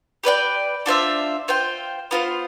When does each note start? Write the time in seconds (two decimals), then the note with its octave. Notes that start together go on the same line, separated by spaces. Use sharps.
0.24 G4 B4 D5 G5
0.86 D4 F4 C5 E5
1.48 F4 C5 G5
2.11 B3 F4 C5